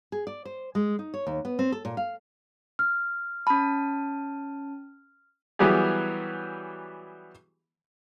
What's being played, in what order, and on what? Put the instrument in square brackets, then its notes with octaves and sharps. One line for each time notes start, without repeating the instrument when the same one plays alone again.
[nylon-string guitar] G#4
D5
C5
G#3
D#4
C#5
D#2
B3
C4
A4
A#2
F5
[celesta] F6
[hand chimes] C#4 A5 [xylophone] B5
[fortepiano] E3 F#3 G3 B3 G4 G#4